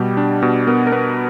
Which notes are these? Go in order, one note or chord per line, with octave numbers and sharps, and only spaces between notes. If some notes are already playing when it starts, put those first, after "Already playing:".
Already playing: B2 G3 G4
D4
B2
B3 A#4
A#4
B3 B4